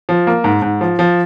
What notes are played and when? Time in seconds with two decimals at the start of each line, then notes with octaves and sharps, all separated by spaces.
0.09 F3
0.27 A#3
0.44 G#2
0.62 G#2
0.81 F3
0.99 F3